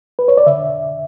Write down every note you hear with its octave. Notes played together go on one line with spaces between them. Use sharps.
B4
C#5
D5
D3 E5